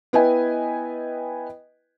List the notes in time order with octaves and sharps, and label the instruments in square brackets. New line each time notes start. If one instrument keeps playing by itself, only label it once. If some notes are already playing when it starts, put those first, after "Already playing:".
[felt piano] B3 E4 B4 D#5 G5 G#5